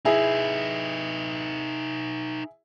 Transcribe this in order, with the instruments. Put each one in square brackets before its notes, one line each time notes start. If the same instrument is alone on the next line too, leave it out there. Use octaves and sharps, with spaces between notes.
[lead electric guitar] D#4 B4 [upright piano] E4 G#4